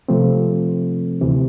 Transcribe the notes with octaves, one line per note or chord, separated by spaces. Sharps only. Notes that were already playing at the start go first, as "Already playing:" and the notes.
C3 F3 A3 C4
D2 C3 E3